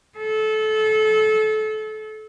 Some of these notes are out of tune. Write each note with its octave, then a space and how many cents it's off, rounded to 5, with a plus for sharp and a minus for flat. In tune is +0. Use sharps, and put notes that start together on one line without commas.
A4 -25